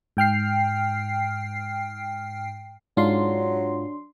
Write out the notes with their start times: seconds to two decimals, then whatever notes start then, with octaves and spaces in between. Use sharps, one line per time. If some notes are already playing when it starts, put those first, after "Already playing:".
0.17 G#2 G5 F6 C7
2.97 G#2 F#3 D4 F4 C6